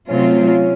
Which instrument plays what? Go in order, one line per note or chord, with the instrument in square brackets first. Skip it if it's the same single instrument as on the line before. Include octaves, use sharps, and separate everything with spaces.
[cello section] C3 F#3 A3 C4 F4 [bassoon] C#4
[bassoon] C#4